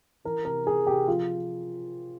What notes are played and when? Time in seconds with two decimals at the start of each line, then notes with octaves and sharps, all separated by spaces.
0.25 E3 A#4
0.45 C3 A#4
0.66 E3 G#4
0.87 C3 G4
1.07 F3 F4